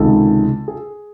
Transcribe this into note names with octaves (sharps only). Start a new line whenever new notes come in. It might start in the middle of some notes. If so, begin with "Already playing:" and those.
Already playing: C#2 C3 D#3 G#3 A4
G#4